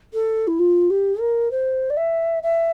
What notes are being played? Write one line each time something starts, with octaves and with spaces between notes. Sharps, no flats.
A4
E4
F4
G4
A#4
C5
D5
E5
E5